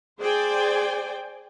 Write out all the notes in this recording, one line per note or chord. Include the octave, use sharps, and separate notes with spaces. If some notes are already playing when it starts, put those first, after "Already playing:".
G#4 C5 D5 G5 G#5